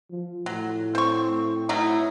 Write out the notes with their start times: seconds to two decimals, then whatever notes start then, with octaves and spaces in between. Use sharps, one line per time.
0.10 F3
0.46 A2 F#3
0.95 C4 C5 C#6
1.69 B2 F#3 D#4 E4